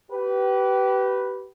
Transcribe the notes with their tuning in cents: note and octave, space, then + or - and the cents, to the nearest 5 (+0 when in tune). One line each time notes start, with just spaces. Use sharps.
G4 -30 B4 +0